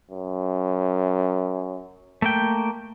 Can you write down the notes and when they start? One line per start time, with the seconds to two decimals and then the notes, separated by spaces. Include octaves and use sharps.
0.11 F#2
2.22 A3 A#3 G5